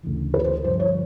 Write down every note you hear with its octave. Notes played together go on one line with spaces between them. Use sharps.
D2 C#3 E3
B4
C5
G2 D3 F3 C5
C#5